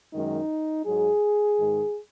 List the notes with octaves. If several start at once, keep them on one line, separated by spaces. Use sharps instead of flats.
F#2 D#3 G#3 D#4
G#2 F#3 G#4
G#2 D#3 G#3